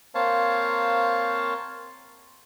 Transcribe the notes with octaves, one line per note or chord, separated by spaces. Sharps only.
A#3 C4 C5 C#5 F5 A5